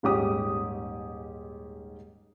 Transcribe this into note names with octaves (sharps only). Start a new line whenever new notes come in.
D#1 G#2 C#4 G4 D6 D#6